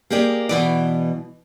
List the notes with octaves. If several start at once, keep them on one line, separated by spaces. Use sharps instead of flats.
A#3 G4 G#4 D5
B2 E3 D5